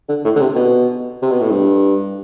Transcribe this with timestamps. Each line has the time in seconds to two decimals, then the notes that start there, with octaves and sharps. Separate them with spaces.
0.09 D3
0.24 A2
0.35 D3
0.40 C3
0.55 B2
1.22 C3
1.31 B2
1.41 A2
1.51 G2